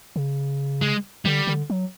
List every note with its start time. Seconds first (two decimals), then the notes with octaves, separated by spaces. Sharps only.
0.16 C#3
0.82 G#3
1.25 D3 G3
1.47 D3
1.70 F#3